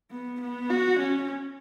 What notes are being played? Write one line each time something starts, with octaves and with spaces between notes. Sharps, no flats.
B3
B3
F#4
C#4